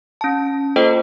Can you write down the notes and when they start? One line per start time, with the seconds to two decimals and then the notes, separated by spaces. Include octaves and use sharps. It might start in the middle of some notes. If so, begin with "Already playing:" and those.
0.21 C#4 A5
0.76 A#3 F4 A4 C5 D#5 G5